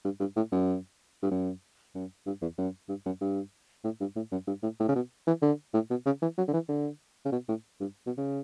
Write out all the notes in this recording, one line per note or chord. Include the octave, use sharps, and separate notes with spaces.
G2
G2
A2
F#2
G2
F#2
F#2
G2
E2
F#2
G2
F#2
G2
A2
G2
A2
F#2
G2
A2
A2
C#3
B2
E3
D3
A2
B2
C#3
E3
F#3
D3
E3
D3
C#3
B2
A2
G2
B2
C#3